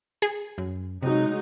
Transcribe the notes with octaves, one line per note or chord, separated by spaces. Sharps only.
G#4
F#2
C3 F#3 G#3 D#4